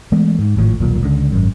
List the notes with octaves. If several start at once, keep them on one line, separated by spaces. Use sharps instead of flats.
E3 G#3 A3 B3
G#2
G#1 A2 E3 F3
D#1 B1 A#2
C#2 D3
G#1 F#2